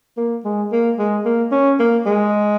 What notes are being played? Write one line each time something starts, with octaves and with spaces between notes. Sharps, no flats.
A#3
G#3
A#3
G#3
A#3
C#4
A#3
G#3